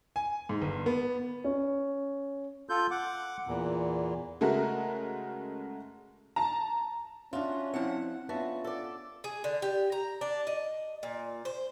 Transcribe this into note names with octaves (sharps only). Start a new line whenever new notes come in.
G#5
G#2
G1
B3
C#4
F4 A4 G6
F#5 D6
E2 A#2
C#3 G#3 A3 F#4 A#4
A5 A#5
C#4 D4 F4 F#4 E5
F3 C4 E4 F#5
B3 C#4 D4 F4 F#4 E5 A5
A4 D5
G#4
D3
G4
A#5
D4
D#5
A#2
C5